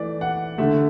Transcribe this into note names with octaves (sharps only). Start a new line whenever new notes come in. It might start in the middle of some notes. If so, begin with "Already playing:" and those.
Already playing: E3 A3 D5
F#5
D3 A3 E5